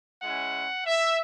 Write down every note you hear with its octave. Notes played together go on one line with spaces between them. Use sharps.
G#3 C#4 E4 F#5
E5